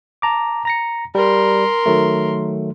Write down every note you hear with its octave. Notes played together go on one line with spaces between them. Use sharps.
A5 A#5 D6
A#5 A#6 C#7
G3 A#4 C6
D#3 F#3 A3